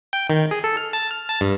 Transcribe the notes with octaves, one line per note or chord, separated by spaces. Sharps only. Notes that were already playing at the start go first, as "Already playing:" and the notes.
G5
D#3
G#4
A4
F6
A5
F6
A5
G2